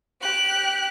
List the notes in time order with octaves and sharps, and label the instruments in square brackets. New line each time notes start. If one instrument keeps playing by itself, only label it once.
[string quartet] G4 F#6